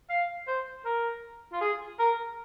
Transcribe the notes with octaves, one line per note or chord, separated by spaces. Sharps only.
F5
C5
A#4
F4
G#4
A#4